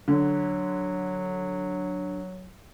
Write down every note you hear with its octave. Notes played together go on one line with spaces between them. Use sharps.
D3 F#3